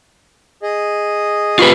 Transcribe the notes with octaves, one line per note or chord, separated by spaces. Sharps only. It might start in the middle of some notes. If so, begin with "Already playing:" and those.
G#4 D#5
F4 G4 B4